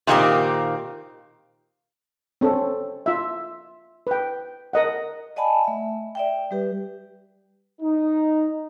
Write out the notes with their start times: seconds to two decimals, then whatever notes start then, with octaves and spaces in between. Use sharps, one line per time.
0.07 A#2 D#3 G#3 A#3 C4 G4
2.41 C4 C#4 A4
3.06 F4 E5
4.07 B4 G5
4.73 A#4 D#5 F#5
5.36 D5 D#5 F#5 G#5 A5 B5
5.64 A3 E5
6.15 D5 E5 G5
6.51 G3 G4 B4
7.81 D#4